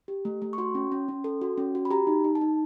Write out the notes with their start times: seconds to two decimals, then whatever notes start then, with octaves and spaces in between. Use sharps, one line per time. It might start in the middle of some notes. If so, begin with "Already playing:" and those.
0.08 G4
0.25 A3
0.42 A3
0.53 C#6
0.58 F#4 C6
0.75 C#4
0.92 C#4
1.08 C#4
1.24 A4
1.41 F#4
1.58 C#4
1.75 F#4
1.85 B5
1.91 G4 A#5
2.07 D#4
2.24 D#4
2.35 A5
2.41 D#4